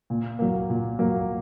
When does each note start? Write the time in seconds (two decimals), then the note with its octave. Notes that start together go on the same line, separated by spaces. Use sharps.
0.10 A#2
0.39 F#3 A#3
0.70 A#2
0.99 F#3 A#3